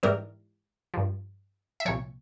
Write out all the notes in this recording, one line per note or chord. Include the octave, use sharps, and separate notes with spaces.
G#2 E3 G3 A#4
G2 F3
E5
C2 A#2 F3 C#5